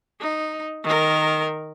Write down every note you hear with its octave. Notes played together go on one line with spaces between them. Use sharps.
D#4
D#3 A#4